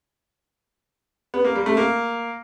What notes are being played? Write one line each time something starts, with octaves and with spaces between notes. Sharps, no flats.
B3
A#3
G3
A3
A#3